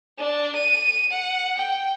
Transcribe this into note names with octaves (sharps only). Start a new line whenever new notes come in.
D4
D#7
F#5
G5